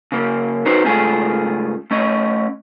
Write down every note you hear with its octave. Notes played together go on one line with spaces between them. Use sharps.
C#3 A#3
D#4 F#4 B4 C5
G#2 C#3 A3 F4 G#4
A3 C#4 D#5